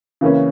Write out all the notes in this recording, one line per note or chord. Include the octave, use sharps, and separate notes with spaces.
C#3 E3 A#3 C#4